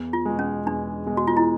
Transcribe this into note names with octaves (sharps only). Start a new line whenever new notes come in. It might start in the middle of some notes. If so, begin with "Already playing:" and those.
Already playing: E2
F4
B2 G#3
C#4
E2 D4
B2 G#3
F#4
F4
E4